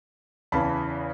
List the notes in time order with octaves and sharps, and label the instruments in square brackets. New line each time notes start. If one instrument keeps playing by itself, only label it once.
[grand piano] E2 C#3 E3 A5 B5